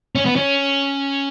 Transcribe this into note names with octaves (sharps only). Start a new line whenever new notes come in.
C#4
B3
C#4